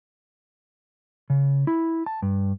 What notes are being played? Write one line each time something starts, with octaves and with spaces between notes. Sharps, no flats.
C#3
E4
A5
G2